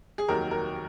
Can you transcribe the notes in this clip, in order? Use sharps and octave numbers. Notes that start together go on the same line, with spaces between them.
G#4
F1 D#2 D#3 F#3 A#4
A#4